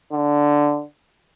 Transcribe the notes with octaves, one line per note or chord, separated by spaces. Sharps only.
D3